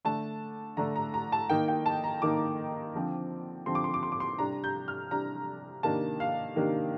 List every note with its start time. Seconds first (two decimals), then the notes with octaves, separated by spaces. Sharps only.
0.05 D3 A3 D4 A5
0.77 D3 A3 D4 A#5
0.96 A#5
1.14 A#5
1.32 A5
1.50 D#3 A#3 D#4 G5
1.68 G5
1.86 A5
2.04 A#5
2.22 D#3 A#3 D#4 D6
2.95 D3 F3 C4
3.66 D3 F3 C4 C6
3.75 D6
3.84 C6
3.94 D6
4.03 C6
4.12 D6
4.20 C6
4.39 C3 G3 D4 A#5
4.64 G6
4.88 F6
5.11 C3 G3 D4 A#5
5.83 C3 D#3 A#3 D4 A5
6.20 F5
6.56 C3 D#3 A#3 D4